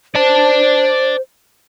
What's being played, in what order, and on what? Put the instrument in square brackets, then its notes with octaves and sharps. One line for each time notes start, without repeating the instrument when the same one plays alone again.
[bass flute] C5 [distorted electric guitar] D5 A5